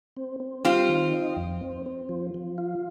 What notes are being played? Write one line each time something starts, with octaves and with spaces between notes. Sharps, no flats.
C4
C4
G3 C4 F4
D#3
D#4
F2
C4
C4
F3
F3
F4